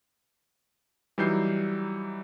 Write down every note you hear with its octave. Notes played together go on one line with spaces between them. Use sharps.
E3 F#3 G3 D#4 G6 C7